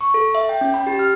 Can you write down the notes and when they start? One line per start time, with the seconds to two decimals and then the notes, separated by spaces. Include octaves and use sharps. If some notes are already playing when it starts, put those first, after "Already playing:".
0.01 C#6
0.14 A4
0.35 E5
0.49 G5
0.61 C#4
0.74 B5
0.87 G4
0.99 F6